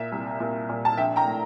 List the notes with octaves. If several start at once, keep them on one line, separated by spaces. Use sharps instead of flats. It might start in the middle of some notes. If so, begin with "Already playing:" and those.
Already playing: A#2 E5
C2
A#2
A#2
A5
A#1 E5 G5
G5 A#5
A2